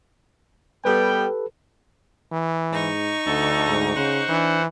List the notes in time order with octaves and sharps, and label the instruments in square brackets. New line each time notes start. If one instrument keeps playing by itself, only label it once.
[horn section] G3 B3 G5 [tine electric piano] G4 A4 B4
[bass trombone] E3
[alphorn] G#2 [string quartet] D#4 C#6
[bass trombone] D2 [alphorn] D3 [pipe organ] A4
[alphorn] G#2
[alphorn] C#3 [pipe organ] C5 F#5
[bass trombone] E3 [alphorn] D4